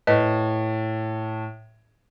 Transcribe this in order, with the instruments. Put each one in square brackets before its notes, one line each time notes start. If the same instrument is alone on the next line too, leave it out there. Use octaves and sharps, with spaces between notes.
[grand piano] A2 [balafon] B4 D#5